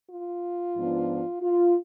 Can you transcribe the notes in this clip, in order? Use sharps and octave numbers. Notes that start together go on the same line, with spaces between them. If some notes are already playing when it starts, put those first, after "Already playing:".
F4
G#2 F3 B3 D4
F4